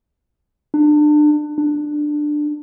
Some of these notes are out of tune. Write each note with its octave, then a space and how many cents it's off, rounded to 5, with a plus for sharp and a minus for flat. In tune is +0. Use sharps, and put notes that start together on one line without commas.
D4 +30
D4 +15